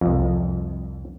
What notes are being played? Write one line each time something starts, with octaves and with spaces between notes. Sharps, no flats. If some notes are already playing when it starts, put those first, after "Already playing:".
C2 F2